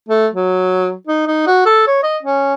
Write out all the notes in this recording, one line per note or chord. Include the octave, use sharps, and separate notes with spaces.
A3
F#3
D#4
D#4
F#4
A4
C#5
D#5
C#4